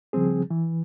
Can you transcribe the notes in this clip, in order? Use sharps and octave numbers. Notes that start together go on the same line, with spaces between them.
C#3 F3 G3 C4 G#4
E3